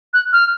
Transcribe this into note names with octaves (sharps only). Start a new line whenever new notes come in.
F#6
F6